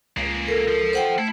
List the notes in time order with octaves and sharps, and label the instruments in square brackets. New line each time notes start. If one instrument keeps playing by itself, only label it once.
[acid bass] C#2 [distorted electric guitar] A#3 G#4
[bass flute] A4 [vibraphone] A#4
[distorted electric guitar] F3
[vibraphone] C5 F#5 G5
[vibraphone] A3 [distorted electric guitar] E4